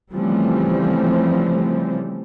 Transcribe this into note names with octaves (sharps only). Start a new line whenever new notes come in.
C#3 E3 F3 G3 A3 C4